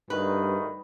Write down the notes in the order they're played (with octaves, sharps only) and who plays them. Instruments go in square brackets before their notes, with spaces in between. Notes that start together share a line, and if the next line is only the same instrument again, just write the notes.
[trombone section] D2 D#3 [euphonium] G2 [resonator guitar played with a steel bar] B4